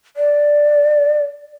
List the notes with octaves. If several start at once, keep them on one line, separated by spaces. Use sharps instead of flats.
D5